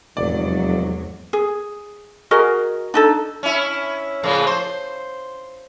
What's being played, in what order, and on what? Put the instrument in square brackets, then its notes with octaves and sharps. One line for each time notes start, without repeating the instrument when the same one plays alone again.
[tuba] F1 [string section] E2 G#2 F#3 [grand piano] D5
[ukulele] G#4
F#4 G#4 A#4 D#5
D4 D#4 A4
[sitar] C#4 E4
A2 C#3 F3
C5